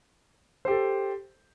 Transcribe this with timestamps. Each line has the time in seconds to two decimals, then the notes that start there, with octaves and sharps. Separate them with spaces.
0.65 C5
0.68 G4
0.71 A4